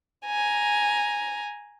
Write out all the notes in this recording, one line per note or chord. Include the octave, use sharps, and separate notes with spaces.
G#5 A#5